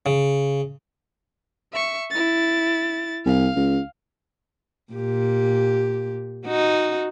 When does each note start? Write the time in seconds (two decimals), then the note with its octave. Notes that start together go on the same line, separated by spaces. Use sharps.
0.06 C#3
1.72 E5 C#6
2.11 E4 A6
3.25 C2 F5
3.56 C#2
4.93 A#2 G4
6.45 D#4 F#4